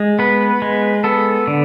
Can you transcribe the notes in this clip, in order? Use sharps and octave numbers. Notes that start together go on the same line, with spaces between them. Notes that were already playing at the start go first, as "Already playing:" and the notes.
Already playing: G#3
B3 B4
G#3
B3 A4
D3